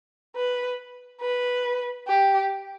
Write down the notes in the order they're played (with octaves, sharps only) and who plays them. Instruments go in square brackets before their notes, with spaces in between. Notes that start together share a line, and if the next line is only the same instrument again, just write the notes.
[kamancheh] B4
B4
G4